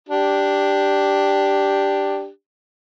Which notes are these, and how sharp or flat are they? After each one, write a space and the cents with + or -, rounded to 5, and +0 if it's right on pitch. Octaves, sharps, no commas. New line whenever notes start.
D4 +0 G4 +0